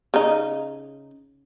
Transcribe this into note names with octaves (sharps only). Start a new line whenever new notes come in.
C#3 D#4